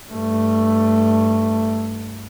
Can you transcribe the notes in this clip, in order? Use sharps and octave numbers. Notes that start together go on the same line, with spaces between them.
G2 A3